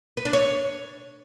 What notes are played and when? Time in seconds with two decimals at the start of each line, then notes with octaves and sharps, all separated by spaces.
0.17 B4
0.25 D4
0.33 C#5